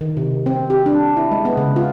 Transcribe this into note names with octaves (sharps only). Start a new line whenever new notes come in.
D#3
C3
C4
G4
D4
E4
G#3
B3
C#3
F4